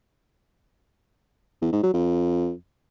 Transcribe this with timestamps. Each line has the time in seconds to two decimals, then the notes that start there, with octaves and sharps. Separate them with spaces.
1.62 E2
1.72 G#2
1.83 F#3
1.94 F2